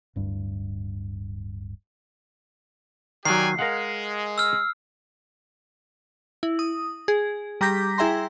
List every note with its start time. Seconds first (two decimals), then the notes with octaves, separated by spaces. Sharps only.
0.16 D1 G2
3.25 D#3 F#3 G4 D5 G#5 C7
3.59 G#3 A#4 F5 F#5
4.38 E6 F6
6.43 E4
6.59 D#6
7.08 G#4
7.61 G3 A#5 D6 G6 A#6 B6
7.98 E4 G#4 E5 G5 A#5 C6